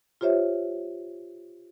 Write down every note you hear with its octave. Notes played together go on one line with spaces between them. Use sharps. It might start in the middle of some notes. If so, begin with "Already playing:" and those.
F4 G4 C5 C#5 E5